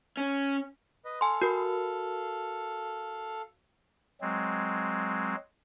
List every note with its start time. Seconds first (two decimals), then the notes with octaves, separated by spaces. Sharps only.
0.17 C#4
1.05 B4 D#5
1.21 A4 F5 G#5 C6
1.42 F#4 A#4
4.21 F#3 G#3 C4